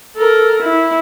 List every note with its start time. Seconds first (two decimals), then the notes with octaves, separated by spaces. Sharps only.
0.17 A4 A#4
0.63 E4